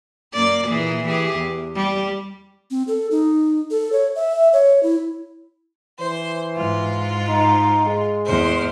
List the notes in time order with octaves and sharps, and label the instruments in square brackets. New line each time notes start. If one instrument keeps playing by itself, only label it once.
[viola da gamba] F#2 A#3 D5
A#2 E3 G#4
E3 G4 G#4
E2
G3
[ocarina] C4
A4
D#4
A4
C#5
E5
C#5
E4
[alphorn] E3 [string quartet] C5
[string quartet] G#2 F4
[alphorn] D#4
G#3
[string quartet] E2 C5